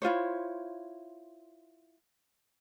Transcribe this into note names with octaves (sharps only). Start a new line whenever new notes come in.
E4 F4 C5 C#5